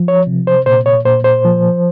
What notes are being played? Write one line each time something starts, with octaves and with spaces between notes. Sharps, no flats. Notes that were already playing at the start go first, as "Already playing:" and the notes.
Already playing: F3
C#5
C3
C5
A#2 C5
C#5
A#2 C5
C5
F3